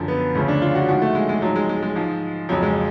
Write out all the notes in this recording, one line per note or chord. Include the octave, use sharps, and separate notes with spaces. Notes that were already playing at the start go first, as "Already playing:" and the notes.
Already playing: F#2 D3 F3
B3
D2 C#3 F3 C#4
D4
F4
F#4
G#2 F3 F#4
A3
G#3
G#3
G#2 F3 F#3
G#3
G#3
G#3
G#2 F3
F2 C#3 F3 F#3
G#3